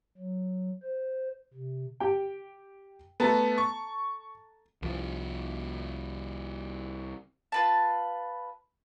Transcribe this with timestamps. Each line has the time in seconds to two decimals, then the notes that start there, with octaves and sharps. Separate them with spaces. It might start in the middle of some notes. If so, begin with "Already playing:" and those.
0.18 F#3
0.83 C5
1.53 C3
2.00 G4 G5
3.20 A3 B3 A4 A5 A#5
3.58 C#6
4.82 C2 F3
7.52 F4 B4 A5